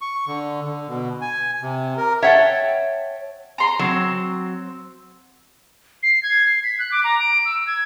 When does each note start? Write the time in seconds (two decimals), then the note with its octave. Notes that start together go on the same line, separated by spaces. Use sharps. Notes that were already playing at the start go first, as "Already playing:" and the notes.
0.01 C#6
0.28 D3
0.66 D3
0.88 B2
1.21 G#5
1.62 C3
1.97 A#4
2.22 C#5 E5 F#5 G5 A5
3.58 A#5 C6
3.79 F#3 C4
6.03 C7
6.23 G#6
6.46 C7
6.64 B6
6.79 F#6
6.92 D6
7.04 A#5
7.19 D7
7.46 E6
7.67 G#6